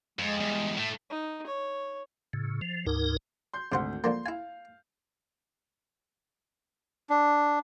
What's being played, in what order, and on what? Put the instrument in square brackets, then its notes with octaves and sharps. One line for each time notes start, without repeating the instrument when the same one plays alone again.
[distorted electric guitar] F2 [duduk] G#3
[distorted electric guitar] E2 G2
A2 A3
[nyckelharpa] D#4
C#5
[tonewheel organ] A2 C#3
F3
D2 G#2 D#4 A#4
[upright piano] C6 G6
[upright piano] G#1 D2 [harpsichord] C3 C5 F#5
[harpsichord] D3 F3 A#3 [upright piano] C6
[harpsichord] E4 G#5 [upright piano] F5
[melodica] D4